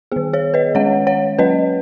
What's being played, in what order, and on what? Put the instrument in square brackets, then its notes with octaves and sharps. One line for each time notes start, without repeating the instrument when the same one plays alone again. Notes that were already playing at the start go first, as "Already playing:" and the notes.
[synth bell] D#3 B3 G#4
G#4 C#5
B4 D#5
D#3 G#3 C#4 C#5 F#5
C#5 F#5
F#3 C#4 B4 D#5